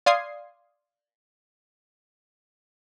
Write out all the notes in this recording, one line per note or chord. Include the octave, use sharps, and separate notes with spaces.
D5 F5 C6 D#6 G#6 C7